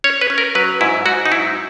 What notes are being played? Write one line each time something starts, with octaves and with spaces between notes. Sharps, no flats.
C#4 C#5
B4
C#4
A#4
F#3 B4
G#2 E4
G#2 F#4
D#4
F#3 E4